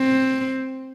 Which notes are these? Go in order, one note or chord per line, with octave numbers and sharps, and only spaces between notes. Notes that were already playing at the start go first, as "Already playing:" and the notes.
Already playing: C4